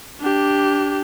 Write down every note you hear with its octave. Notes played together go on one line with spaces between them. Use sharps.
D4 G4